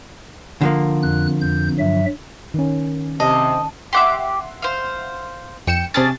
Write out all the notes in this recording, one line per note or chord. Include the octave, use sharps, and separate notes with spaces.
D3 F3 A#3
F2 F#6
F2 G6
G2 F#3 E5
D#3 C#4
C3 D#5 A5
G4 E5 F#5 C6 D6
C5 F5
F2 G5 C#7 E7
C3 C#4 D4 G#4 A6